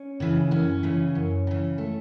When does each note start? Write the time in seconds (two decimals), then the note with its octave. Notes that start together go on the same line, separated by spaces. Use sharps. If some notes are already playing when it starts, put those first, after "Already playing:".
Already playing: C#4
0.20 C#3 E3
0.51 F#2 C#4
0.83 C#3 E3
1.15 F#2
1.47 C#3 E3
1.78 A3